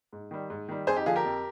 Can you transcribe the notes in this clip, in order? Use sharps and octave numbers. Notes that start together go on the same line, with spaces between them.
G#2
D#3 G3
G#2
D#3 G3
F2 G#4 C5
D#4 G4
D3 F3 F4 G#4
G4 A#4
F2